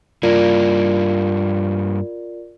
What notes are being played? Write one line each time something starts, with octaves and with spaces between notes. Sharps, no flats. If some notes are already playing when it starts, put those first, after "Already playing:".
G2 A#3 F4 A#4 D5